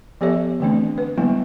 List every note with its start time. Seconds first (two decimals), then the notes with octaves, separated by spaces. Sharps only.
0.21 F3 B3 G4 A4 C#5 E5
0.60 D3 E3 A3 C4 D4
0.98 B4
1.18 D3 F#3 G3 A#3 B3 E4